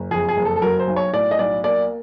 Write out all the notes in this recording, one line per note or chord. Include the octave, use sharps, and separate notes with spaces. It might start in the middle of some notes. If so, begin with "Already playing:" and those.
Already playing: F#1
F2 G#4
G#4
F#1
A4
A4
F#3 A#4
C5
B1
C#5
A2 D5
D#5
B1 D5
A#3 D5